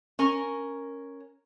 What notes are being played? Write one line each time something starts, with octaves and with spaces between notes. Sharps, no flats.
C#4 A#4